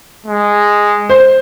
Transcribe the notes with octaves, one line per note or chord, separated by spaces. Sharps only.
G#3
C5